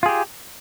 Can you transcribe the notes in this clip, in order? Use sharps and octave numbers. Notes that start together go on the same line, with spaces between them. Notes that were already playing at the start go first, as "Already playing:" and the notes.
F4 G4 G#4